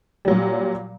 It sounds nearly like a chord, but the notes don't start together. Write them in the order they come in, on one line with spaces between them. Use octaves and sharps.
G3 F#3 A#2